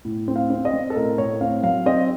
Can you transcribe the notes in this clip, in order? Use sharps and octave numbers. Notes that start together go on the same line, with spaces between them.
A2
C4
F5
C4
D#5
C4
A4
A2 A#4
A2 C#5
C4 F5
F#3 F5
C4 D#5